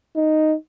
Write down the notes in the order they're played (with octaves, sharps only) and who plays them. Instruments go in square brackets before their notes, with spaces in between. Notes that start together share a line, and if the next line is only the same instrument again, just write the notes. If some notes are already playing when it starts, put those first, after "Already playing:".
[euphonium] D#4